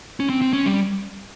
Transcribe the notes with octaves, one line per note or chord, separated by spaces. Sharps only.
C#4
C4
C4
C#4
G3